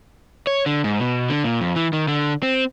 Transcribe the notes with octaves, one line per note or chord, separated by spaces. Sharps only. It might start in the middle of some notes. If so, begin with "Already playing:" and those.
C#5
D3
G#2
B2
D3
A#2
F2
E3
D#3
D3
C4